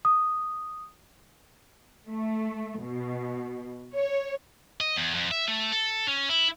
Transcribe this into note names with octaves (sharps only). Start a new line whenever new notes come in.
D#6
A3
B2
C#5
D#5
E2
F2
E5
A3
A4
C#4
E4